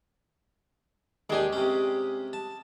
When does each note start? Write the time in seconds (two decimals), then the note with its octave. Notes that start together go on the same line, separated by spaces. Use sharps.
1.30 D#2 G#3 D4 G4 G#5
1.53 C3 C#4
2.33 A5